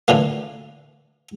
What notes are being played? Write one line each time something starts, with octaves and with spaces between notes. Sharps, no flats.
A2 D3 E3 A#3